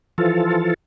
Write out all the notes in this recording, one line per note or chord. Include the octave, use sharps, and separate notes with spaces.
E3 F3 F4 A4